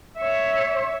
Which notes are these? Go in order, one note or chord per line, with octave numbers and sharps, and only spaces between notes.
C#5 E5